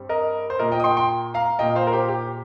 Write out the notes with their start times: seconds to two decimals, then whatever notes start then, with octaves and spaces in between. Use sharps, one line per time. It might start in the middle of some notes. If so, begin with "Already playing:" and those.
Already playing: G2 G3 C4
0.09 A#4 D#5
0.50 C5
0.59 A#2 A#3 A#4 D#5
0.72 D#5 G5
0.80 D#6
0.84 G5 C6
0.97 G5 C6
1.34 F5 A#5
1.59 A#2 A#3 D#5 G5
1.75 C5 F5
1.87 A#4
1.92 G4 C5
2.09 G4